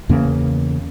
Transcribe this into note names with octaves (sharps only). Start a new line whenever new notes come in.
E2 C#3 A#3